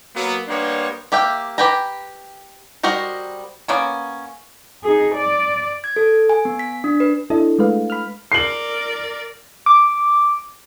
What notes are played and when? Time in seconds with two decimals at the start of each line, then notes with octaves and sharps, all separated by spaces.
0.15 F#3 A#3 B3
0.48 G3 A#3 B3 D4 C5 C#5
1.12 A#3 G4 E5 G5
1.58 G4 B4 G5 G#5 A#5
2.83 G3 F#4 A#4 C5 D#5
3.68 A#3 B3 C#4
4.84 D#4 G#4
5.16 D5
5.84 G#6
5.96 A4
6.29 G#5
6.45 B3
6.59 B6
6.84 D4
7.00 B4
7.30 D4 E4 A4 D#5
7.59 G#3 A3 B4 F5
7.90 B5 F6
8.32 A#4 D5 C7 F#7
9.66 D6